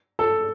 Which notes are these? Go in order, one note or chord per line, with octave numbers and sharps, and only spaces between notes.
A4